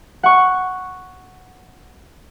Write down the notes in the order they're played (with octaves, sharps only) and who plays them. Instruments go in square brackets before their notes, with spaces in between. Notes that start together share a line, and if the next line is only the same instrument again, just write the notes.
[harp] F#5 C#6